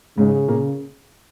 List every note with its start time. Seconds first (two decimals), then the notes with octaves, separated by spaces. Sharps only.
0.17 G#2 C#3 G#3
0.48 A#2 A#3